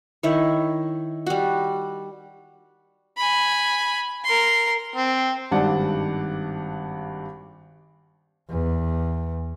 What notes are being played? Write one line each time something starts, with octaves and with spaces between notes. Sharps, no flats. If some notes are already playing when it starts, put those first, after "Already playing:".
D#3 E4 C#5
G3 F#4
G#5 B5
A#4 C6
C4
G#1 G2 D#3 D5 F#5 A5
E2